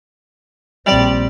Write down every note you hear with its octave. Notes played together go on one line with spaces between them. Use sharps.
A#1 G3 C4 D5